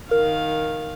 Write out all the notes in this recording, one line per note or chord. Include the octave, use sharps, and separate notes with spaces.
D#3 A#4 F5